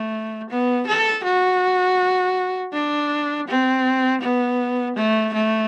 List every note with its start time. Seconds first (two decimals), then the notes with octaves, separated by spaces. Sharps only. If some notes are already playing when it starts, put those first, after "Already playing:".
Already playing: A3
0.50 B3
0.87 A4
1.24 F#4
2.73 D4
3.48 C4
4.21 B3
4.96 A3
5.34 A3